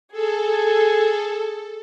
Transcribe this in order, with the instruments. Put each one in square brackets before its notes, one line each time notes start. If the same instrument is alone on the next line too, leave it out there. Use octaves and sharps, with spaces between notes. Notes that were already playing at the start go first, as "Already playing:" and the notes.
[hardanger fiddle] G#4 [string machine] A4